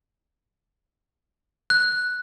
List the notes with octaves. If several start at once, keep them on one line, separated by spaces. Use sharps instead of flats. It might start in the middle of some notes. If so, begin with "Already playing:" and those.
F#6